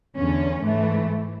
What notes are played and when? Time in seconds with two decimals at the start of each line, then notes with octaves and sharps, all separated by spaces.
0.16 E2 D3 C#4
0.63 G#2 E3 A3